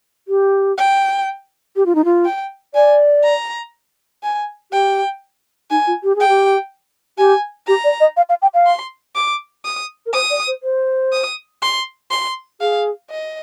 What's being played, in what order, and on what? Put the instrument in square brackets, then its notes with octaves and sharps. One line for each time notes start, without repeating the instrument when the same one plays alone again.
[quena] G4
[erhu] G5
[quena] G4
F4
D#4
F4
[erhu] G5
[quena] D5 [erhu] G#5
[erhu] A#5
G#5
[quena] G4 [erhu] G5
[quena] D#4 [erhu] G#5
[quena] F4
G4
[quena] G#4 [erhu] G5
[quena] G4
[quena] G4 [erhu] G#5
[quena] G4 [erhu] A#5
[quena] D5
D#5
F5
F5
G5
F5
[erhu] C6
D6
D#6
[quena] A#4
[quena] C5 [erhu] D#6
[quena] D5
C5
C5
[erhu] D#6
C6
C6
[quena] G#4 [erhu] F5
[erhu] D#5